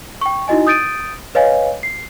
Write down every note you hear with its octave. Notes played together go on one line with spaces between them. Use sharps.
G5 C#6
D#4 E4 F#4 D#5 G#5
D#6 G6 A6 D7 D#7
B4 C#5 D#5 F5 G#5
C7